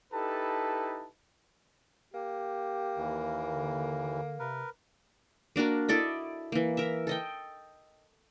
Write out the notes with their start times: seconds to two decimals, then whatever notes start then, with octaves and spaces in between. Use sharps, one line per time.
0.13 D#4 E4 G4 A4 B4 A5
2.14 A#3 G4
2.97 D#2 E3
3.51 D3
4.39 C3 A#4 B4
5.56 A#3 D4 F#4 A#4
5.89 E4 A4 D5 D#5
6.52 E3 A#3
6.77 A#4 E5
7.07 A4 D#5 G5